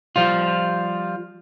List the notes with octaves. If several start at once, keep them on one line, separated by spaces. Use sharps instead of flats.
F3 G3 F4